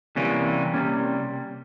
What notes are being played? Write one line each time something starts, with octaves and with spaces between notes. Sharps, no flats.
C3 E3 G3 A#3 C#4
C3 E3 G3 A#3 C#4